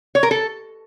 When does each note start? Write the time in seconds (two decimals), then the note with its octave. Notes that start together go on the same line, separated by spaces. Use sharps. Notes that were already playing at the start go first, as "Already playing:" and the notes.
0.15 C#5
0.23 A#4
0.31 A4